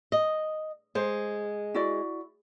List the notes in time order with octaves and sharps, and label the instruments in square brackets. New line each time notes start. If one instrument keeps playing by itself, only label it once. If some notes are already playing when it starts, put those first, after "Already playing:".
[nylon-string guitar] D#5
[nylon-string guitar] G#3 [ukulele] C5
[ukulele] E4 F#4 D5